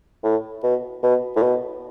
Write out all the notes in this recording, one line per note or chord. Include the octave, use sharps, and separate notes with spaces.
A2
B2
B2
A2
B2